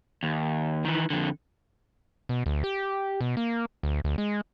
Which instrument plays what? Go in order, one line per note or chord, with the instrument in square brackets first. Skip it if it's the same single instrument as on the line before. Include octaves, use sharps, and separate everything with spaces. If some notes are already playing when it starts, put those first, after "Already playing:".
[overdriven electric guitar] D#2
D#3 E3
F2 D3
[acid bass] B2
D2
G4
B2
A#3
D2
D2
G#3